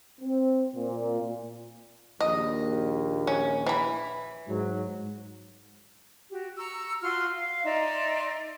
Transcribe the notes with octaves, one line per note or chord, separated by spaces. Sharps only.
C4
A#2
A#1 D#2 D#5
C#4
E3 B5
G#2 F#3
F#4 G4
A#5 C#6 E6
F4 F#4 C6 F6
F5
D#4 D5 E5 C6